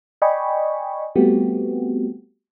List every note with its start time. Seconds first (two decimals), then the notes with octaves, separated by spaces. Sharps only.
0.22 D5 D#5 G5 G#5 B5 C#6
1.15 G3 A3 B3 C4 F#4 G4